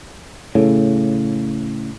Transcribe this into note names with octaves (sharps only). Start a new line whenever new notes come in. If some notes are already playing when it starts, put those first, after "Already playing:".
A2 C#3